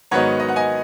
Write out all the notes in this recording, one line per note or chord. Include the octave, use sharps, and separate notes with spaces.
G#2 D#3 F#3 B3 D#4 C#5 F#5
D#5
F#5
D#5 G#5